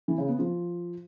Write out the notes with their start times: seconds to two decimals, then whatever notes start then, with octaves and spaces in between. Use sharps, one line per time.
0.08 E3
0.18 C#3
0.29 B3
0.39 F3